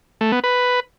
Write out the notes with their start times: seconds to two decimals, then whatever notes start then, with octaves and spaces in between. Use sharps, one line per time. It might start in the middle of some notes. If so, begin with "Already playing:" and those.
0.21 A3
0.32 B3
0.44 B4